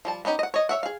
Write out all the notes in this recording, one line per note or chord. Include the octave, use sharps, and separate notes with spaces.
F3 G3 A5
B3 C#4 D#4 G4
D#5 F#5
C#5 D#5
C#5 E5 F#5
G#4 F5